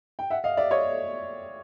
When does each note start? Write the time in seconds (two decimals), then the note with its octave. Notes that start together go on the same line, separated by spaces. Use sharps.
0.19 G5
0.30 E5 F#5
0.44 D#5 F5
0.57 D5 E5
0.71 C#5 D#5